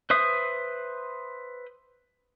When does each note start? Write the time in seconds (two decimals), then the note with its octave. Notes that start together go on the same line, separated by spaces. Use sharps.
0.10 B4 C5 E5 D#6